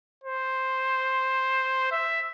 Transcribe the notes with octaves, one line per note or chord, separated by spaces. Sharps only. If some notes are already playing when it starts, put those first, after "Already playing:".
C5
E5